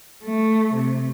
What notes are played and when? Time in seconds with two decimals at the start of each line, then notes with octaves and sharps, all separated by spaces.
0.24 A3
0.74 C3